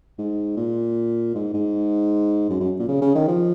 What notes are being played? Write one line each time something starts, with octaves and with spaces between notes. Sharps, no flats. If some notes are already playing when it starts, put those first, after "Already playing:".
G#2
A#2
G#2
G#2
F#2
F#2
A#2
C#3
C#3
D#3
F3